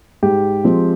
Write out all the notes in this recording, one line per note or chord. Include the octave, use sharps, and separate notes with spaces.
G#2 G4
F3 G#3 C4